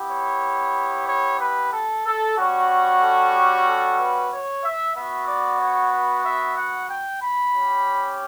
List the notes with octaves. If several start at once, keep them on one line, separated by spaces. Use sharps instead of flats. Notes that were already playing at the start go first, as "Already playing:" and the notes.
Already playing: B3 E4 G4
C#5
C#5
B4
A4
A4
G3 C#4 F#4
A4
G4
A4
B4
C#5
E5
B3 F#4 E5
D5
C#5
B4
E5
F#5
G5
B5
C#4 G4